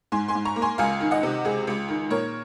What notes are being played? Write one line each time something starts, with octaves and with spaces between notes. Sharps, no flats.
G#2 G#5 C6
G#5 C6
G#2
A#5 C#6
A#3
G#5 C6
C#2 F5 G#5
D#3
D#5 F#5
C3
C#2 G#4
C#2
D#3
A#2 A#4 C#5